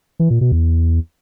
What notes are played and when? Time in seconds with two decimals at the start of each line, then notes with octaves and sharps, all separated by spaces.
0.19 E3
0.30 A#2
0.41 B2
0.52 E2